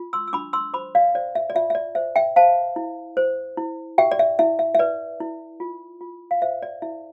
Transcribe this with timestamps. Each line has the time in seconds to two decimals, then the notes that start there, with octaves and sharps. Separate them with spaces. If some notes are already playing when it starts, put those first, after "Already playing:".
Already playing: F4
0.13 C6 E6
0.28 E6
0.33 D4 B5 D6
0.53 C6 E6
0.73 C5 B5 D6
0.95 D5 F5
1.15 C5 D5
1.35 E5
1.50 D5
1.55 F4 E5
1.70 E5
1.75 D5
1.95 C5 E5
2.16 E5 G5
2.36 C5 F5 A5
2.76 E4
3.17 C5
3.57 E4
3.98 G4 E5 G5
4.12 D5
4.19 E5
4.39 E4 E5
4.59 E5
4.75 E5
4.79 B4 D5
5.20 E4
5.60 F4
6.01 F4
6.31 F5
6.42 C5 E5
6.62 D5
6.82 E4 E5